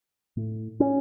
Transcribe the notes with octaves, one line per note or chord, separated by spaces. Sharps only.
A2
C#4